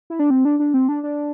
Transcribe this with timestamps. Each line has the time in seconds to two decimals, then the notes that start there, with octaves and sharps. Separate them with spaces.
0.10 E4
0.19 D4
0.30 C4
0.45 D4
0.59 D4
0.74 C4
0.89 D4
1.03 D4